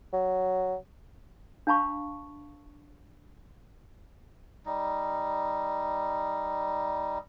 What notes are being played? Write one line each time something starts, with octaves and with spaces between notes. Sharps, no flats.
F#3
D4 F5 A5 B5 C#6
G3 D#4